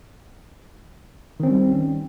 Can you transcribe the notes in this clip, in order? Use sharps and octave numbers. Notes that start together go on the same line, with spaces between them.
D#3 G3 C4 C#4